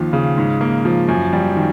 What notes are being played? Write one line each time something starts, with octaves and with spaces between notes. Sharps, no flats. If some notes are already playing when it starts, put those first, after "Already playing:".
Already playing: D#2 D#3 F3
C#3
G#2
A#3
F3
F#2
G3
D#3